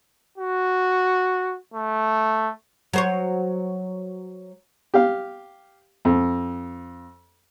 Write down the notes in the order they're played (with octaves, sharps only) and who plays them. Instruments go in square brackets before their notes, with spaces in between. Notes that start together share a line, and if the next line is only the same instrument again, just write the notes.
[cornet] F#4
A3
[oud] F#3 C5 C#5
[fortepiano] G4 F5
F2